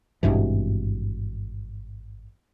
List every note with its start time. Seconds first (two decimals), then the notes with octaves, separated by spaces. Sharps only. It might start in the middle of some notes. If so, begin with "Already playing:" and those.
0.23 G#1 G2 B2 E3